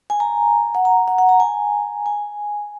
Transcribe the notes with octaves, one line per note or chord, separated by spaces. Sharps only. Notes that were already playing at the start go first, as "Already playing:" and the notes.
G#5
A#5
F#5
A#5
F#5
F#5
A#5
G#5
G#5